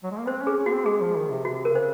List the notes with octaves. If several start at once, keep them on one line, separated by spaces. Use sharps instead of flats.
F#3
G#3
A#3
C4 C5
C#4
G#4
C#4
A#3 F#4
C4
G#3 G#4
F3
D#3
C3
C3 F#4
A#4
C#3 C5